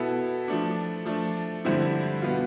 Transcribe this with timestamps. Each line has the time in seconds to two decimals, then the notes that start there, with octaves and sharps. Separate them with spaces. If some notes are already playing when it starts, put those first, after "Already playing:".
Already playing: B2 B3 E4 A4
0.48 F3 A3 D4
1.05 F3 A3 D4
1.65 G2 D3 F3 C4 E4
2.22 B2 B3 F4